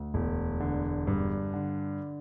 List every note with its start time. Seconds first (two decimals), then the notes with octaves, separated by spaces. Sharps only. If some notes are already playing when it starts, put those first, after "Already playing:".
Already playing: D2
0.14 E1
0.60 D3
1.07 G2
1.54 D3